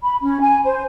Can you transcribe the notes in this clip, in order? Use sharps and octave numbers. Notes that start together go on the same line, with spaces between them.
B5
C#4
G#5
C5